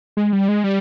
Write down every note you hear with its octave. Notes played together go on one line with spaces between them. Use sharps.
G#3
G3
G#3
G3